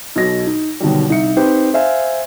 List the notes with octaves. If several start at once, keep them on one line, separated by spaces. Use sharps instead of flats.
B1 B2 D#5 A#6
D#4
B2 D3 D#3 F#3 G3
C2 D#4 E5 C#7
C4 D#4 G4 B4 C5
C5 E5 F5 G#5